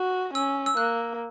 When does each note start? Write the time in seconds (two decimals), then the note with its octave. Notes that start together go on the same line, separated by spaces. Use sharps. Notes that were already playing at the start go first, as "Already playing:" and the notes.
Already playing: F#4
0.34 C#4 E6
0.66 E6
0.77 A#3 F#6